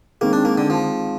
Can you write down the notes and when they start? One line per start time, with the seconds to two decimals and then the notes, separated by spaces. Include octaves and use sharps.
0.21 D#3 G#3 A#3 C4
0.33 D4
0.45 A#3
0.58 D3
0.70 F3